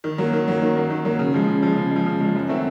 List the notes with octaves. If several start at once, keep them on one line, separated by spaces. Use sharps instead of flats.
D#3
F#3 A#3
D#3
F#3 A#3
D#3
F#3 A#3
D#3
F#3 A#3
C#3
F3 G#3
C#3
F3 G#3
C#3
F3 G#3
C#3
F3 G#3
F#2
D#3 F#3 A3 C4